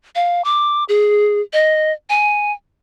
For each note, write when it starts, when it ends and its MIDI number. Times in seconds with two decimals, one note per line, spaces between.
0.15 0.44 77
0.44 0.84 86
0.89 1.42 68
1.53 1.92 75
2.09 2.52 80